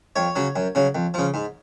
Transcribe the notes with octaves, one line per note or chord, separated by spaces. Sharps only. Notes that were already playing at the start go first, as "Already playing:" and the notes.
F2 C#5
C#3 F#3
F#2
C#3 F#3
F2
C#3 F3
G#2